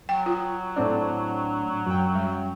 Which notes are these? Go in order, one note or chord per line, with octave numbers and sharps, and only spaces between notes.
F#3 G5
F4
A2 C4 D4
F#2 G5
G3